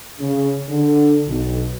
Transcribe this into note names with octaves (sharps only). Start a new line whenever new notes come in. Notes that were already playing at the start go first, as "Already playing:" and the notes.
C#3
D3
B1